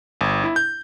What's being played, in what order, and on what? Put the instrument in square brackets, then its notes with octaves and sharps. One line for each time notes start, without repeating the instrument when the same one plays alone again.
[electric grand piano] G1
E4
G6